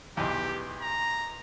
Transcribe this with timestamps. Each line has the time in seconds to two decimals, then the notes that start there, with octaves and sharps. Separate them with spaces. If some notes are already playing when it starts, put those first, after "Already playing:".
0.17 B1 E2 G4
0.81 A#5